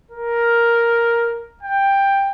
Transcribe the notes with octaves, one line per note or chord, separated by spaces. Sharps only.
A#4
G5